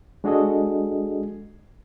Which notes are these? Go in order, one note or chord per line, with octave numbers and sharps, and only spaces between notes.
G#3 D4 F#4 G#4 A4 D#5